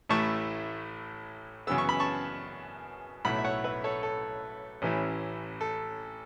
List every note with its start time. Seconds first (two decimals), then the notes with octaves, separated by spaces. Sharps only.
0.09 A1 A2 A3 E4 A5 C#6
1.67 F#2 C#3 E3 B3 E6
1.78 C#6
1.89 B5
2.00 A5 C#6
3.25 B1 A2 A3 E4 F#5 B5
3.39 E5
3.44 C#5 F#5
3.64 B4 E5
3.84 A4 C#5
4.03 A4
4.82 A1 A2 E3 C#4 E4
5.61 A4